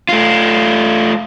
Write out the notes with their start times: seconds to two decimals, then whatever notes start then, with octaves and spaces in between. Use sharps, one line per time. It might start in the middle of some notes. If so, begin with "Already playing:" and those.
0.09 A3 F4